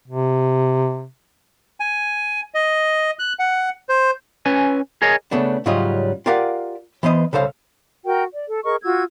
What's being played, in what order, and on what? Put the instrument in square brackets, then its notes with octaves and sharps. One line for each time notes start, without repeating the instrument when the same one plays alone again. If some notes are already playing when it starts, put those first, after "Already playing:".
[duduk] C3
[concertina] G#5
D#5
F#6
F#5
C5
[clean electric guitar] C#4 B4 G#5
G#4 A#4 C#5 D#5
[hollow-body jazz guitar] C#3 A3 B3 D4
G#2 C#3 F#3 G3 F4 D#5
F4 G4 A#4 D5 F5 F#5
E3 B3 C5 D#5
C2 C#3 A4 C5 F5
[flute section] F#4 A#4 G5
D5
A4
G#4 A#4 D#5 C#6
F4 F#4 E6 G#6